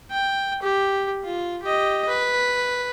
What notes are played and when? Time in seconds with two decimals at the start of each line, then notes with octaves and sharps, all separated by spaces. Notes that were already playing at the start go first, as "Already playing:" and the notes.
0.10 G5
0.62 G4
1.24 F4
1.62 G4 D#5
2.08 B4